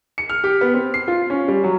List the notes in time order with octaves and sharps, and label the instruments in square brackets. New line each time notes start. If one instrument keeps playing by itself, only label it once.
[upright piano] C#7
F6
G4
B3
C4
C7
F4
C#4
G3
F#3